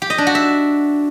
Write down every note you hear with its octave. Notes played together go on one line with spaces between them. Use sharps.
G4
D#5
D4
F#4
E5